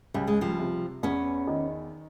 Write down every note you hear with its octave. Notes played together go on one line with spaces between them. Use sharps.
C#2 G3
G#3
F3 G3
C3
E2 B3 C#4
D#3